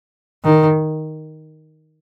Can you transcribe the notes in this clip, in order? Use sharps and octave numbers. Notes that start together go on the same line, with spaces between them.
D#3